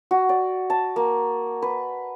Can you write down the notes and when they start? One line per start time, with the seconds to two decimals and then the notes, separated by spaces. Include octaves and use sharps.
0.11 F#4
0.29 D5
0.70 A5
0.96 A#3
1.62 B4